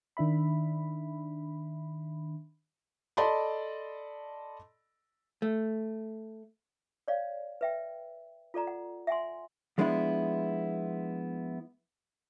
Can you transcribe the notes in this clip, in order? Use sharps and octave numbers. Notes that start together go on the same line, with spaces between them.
D#3 D4 E5 B5
A4 D5 D#5 A5 B5 C6
A3
C#5 D5 F5
B4 E5 G5
F4 A4 D5 A#5
F#5
E5 F#5 G#5 C6
F3 G#3 B3 D4 E4